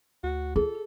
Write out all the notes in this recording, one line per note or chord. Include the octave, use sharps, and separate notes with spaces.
D2 F#4
F4 G#4 A4